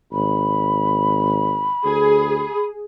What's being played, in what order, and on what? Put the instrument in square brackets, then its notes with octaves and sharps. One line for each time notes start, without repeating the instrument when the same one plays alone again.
[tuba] G#1 [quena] B5
[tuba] D2 [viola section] G#4